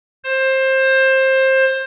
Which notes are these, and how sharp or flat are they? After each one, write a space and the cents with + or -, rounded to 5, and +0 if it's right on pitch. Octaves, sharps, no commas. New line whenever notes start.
C5 +20